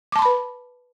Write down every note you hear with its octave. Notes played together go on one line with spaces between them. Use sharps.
B4 A5 B5 C6 D6